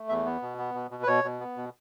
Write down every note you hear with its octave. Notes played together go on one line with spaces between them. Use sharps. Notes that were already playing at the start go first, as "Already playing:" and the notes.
Already playing: A3
E2 E5
B3
B2
B3
B2
B2
B4
B2 C#5
B2
B3
B2